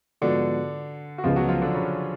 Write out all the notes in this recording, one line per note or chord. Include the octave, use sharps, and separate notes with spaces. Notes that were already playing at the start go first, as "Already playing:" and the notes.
G#2 D3 F3 B3 D4 F#4
F#4
C#2 C#3 F3 G#3 B3 F4
F#3 F#4
F3 F4
D3 D4
C#3 C#4